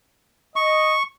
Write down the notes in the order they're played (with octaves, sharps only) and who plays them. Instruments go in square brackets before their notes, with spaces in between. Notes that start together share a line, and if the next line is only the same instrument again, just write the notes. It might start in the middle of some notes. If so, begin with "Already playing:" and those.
[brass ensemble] D#5 [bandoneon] C#6